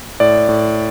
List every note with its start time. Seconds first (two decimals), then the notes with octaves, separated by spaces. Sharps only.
0.20 A2 D5
0.49 A2